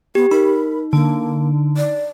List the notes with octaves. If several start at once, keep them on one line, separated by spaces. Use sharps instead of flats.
B3 G4
D#4 A#4 B5
D3 A#3
D5